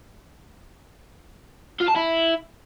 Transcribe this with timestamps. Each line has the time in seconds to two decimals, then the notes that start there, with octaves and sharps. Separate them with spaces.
1.80 F4
1.88 A5
1.95 E4